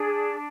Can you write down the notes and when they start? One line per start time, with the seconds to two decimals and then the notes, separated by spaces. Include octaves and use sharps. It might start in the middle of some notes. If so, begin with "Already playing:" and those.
Already playing: D4 G#4